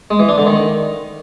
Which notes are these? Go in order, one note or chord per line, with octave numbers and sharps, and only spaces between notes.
G#3
E3
D4
D3
D#3